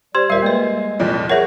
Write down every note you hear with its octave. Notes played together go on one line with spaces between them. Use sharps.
G3 G4 C5 C6 G#6
D#2 A#2 G3 A#4 E5 C7
G#3 A#3 B4
C2 F2 A#2
G#4 A#4 C#5 E5 F#5